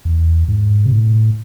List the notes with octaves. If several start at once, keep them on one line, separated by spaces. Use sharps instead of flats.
E2
G#2
C3
A2